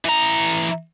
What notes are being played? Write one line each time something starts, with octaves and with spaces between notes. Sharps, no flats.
E3 A#5